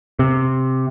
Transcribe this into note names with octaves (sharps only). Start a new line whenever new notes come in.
C3